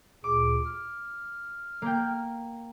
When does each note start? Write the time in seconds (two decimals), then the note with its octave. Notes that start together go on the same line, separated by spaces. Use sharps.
0.24 D2 A#2 G#4 D6
0.65 F6
1.82 A#3 G5